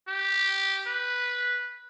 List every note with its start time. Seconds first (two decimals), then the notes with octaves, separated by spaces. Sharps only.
0.08 G4
0.86 B4